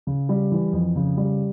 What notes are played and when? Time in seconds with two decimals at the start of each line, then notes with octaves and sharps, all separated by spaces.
0.07 C#3
0.29 G3
0.51 E3
0.73 F2
0.96 C#3
1.17 G3